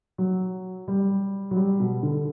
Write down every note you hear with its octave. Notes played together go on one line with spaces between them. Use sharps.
F#3
G3
F#3
G3
B2
D3